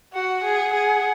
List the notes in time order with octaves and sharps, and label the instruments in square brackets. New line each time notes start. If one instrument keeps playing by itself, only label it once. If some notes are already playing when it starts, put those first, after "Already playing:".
[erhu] F#4 [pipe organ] F#5
[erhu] G#4
G#4